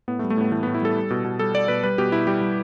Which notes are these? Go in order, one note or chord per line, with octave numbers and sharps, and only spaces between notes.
A2 B3
A3
G3
A3
A2 B3
E3 A3
A2 B3
E4
G3 A4
G3
B2
B2
G3 A4
G3 D5
B2 B4
G3 B4
B2 G4
B2 E4
G3 G4
G3